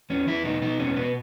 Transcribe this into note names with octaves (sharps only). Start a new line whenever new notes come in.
E2 C#4
E2 E4
B2 D#4
B2 D#4
E2 C#4
B2 B3